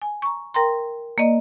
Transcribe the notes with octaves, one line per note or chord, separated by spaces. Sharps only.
G#5
A#5 C#6
A#4 G5 A#5 C6
A#3 D5 D#5